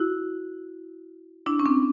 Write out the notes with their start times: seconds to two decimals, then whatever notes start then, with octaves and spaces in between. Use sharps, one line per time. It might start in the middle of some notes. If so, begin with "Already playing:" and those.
Already playing: E4 F#4
1.46 D4 E4
1.59 C#4
1.66 C4 D4